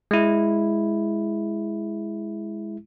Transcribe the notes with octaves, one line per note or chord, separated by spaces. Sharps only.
G#3 E4